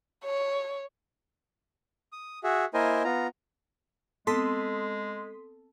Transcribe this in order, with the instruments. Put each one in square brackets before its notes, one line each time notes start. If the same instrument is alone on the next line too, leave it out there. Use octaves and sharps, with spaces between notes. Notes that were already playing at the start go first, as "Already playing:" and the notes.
[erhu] C#5
[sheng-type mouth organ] D#6
F#4 G#4 E5
A#3 E4 A#4 C5 D#5 G#5
B3 F4 A#5
[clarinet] G#3 [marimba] B3 C4 [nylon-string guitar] A4 [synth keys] C6 D#6 B6